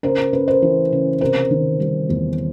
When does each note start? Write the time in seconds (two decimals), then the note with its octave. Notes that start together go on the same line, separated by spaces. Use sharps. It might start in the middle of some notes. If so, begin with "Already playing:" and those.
0.03 C#3 A#4 C5
0.33 C#3 B4
0.48 A#4 C5
0.62 E3
0.92 C#3
1.21 C3 A#4 C5
1.51 D#3
1.80 G3
2.09 E2